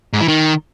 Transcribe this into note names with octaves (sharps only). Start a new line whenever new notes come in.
G#2
E3
D#3